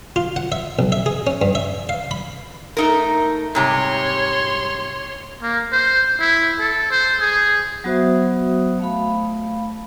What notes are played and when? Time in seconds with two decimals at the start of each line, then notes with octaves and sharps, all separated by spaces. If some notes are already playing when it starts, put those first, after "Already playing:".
0.16 F4
0.36 F#5
0.52 E5
0.79 B1
0.92 E5
1.06 G#4
1.27 C#4
1.42 G2
1.55 E5
1.89 F5
2.11 B5
2.77 A3 D#4 A#4
3.55 G#2 C3 G3 C#5 C6
5.42 A#3
5.72 C5
6.20 E4
6.59 A4
6.91 C5
7.20 G#4
7.84 F#3 B3 F#4 C5 E5 D#6
8.80 A3 F5 B5